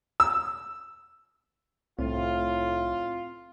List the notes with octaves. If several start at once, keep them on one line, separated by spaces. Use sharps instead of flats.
E6
C2 A2 C4 F4